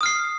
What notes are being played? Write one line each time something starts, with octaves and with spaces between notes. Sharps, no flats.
D#6 F6 C7